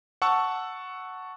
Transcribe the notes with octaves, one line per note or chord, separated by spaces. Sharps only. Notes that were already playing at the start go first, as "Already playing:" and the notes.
F#5 A5 C#6 E6